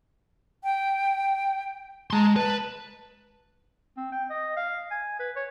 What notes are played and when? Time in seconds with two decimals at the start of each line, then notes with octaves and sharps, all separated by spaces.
0.63 G5
2.11 G#3 A5 A#5 C6
2.36 B4 A5
3.97 C4
4.12 G5
4.30 D#5
4.56 F5
4.91 G#5
5.20 B4
5.36 C#5